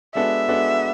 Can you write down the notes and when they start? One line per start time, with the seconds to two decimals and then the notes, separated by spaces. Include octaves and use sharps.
0.15 G#3 B3 D4 F#4 A4 E5
0.48 G#3 B3 D4 F#4 A4